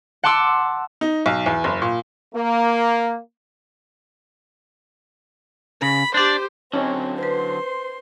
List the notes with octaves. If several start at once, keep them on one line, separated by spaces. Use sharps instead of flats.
F#5 A5 C6 D6 E6
D#4
B1
E2
F#1
A#2
A#3
C#3 B5
D4 G4 C5 D5
D3 F#3 C4 C#4 D#4 C#5
B4 C5 C6